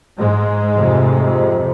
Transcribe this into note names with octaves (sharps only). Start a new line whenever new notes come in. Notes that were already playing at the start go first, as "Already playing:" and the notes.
G#2 G#3
F2 C3